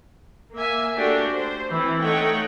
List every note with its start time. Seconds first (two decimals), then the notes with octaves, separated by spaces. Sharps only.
0.54 A#3 E5 G#5
0.96 A3 D4 F#4 G4
1.32 C5
1.69 E3 C4
2.01 A3 D#4 C#5 F#5 G5